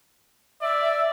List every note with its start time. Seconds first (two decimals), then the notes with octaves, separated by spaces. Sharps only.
0.62 D5 E5